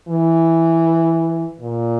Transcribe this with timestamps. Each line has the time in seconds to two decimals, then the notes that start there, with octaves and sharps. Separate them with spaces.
0.08 E3
1.60 A#2